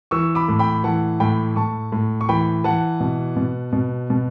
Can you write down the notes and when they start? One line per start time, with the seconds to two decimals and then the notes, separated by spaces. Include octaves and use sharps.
0.11 E3 C#6 E6
0.35 B5 D6
0.48 A2
0.59 G5 B5
0.84 E3 F#5 A5
1.20 A2 G5 B5
1.56 A2 A5 C#6
1.92 A2
2.21 C#6
2.29 E3 G5 B5
2.64 E3 F#5 A5
3.00 B2
3.37 B2
3.73 B2
4.10 B2